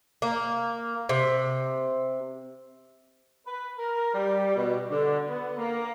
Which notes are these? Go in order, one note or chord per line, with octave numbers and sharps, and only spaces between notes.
A#3
C3
B4
A#4
G3
B2
D3
B3
A#3